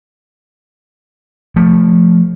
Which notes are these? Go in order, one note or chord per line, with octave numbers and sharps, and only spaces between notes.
F3 A3